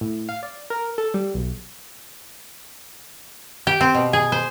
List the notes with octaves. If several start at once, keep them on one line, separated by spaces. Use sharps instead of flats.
A2
F5
D5
A#4
A4
G3
B1
G4
C4
B2
G#4
C5